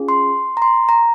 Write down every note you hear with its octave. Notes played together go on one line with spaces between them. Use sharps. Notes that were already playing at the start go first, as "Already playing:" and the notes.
Already playing: C#4 F4 G#4
C6
A#5
C6
A#5